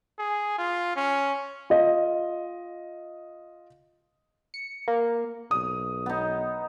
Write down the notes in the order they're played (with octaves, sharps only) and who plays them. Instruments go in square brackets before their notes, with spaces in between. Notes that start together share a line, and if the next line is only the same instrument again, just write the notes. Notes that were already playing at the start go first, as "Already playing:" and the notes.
[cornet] G#4
F4
C#4
[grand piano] F4 D#5
[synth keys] C#7
A#3
[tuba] B1 [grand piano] D#6
[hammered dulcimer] B3 D#4